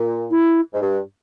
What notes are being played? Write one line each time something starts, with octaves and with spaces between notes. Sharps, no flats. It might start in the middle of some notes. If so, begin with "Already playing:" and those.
Already playing: A#2
E4
G#2
G2